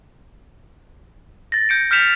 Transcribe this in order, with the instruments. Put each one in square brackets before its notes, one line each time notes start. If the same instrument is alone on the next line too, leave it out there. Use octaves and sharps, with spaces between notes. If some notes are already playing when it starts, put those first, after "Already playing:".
[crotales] A6 A#6
G6 C#7 D7
F6 G6 B6 C#7 E7 F7